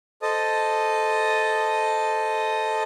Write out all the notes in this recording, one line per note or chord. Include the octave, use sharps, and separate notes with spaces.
A4 C5 D#5 A5 D#6